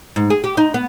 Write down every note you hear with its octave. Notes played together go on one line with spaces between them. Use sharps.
G#2
G#4
G4
D#4
B3